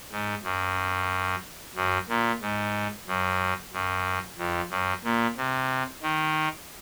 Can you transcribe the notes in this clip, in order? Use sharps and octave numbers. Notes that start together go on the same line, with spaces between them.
G#2
F#2
F#2
A#2
G#2
F#2
F#2
F2
F#2
A#2
C3
D#3